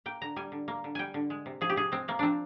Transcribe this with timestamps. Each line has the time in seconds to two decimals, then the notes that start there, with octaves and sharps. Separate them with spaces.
0.06 A#3 G5
0.21 D3 A#5
0.36 G3 G#5
0.52 D3
0.68 A#3
0.84 D3
0.95 G3 G5 G#5
1.14 D3
1.30 G#3
1.46 C3
1.61 F3 G#4
1.69 G4
1.76 C3 G#4
1.92 G#3 C4
2.08 C3 A#3
2.19 F3 C4 D4